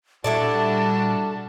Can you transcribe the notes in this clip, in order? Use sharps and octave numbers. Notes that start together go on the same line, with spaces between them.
A#2 G3 D4 E4 F#4 A4 D5 A5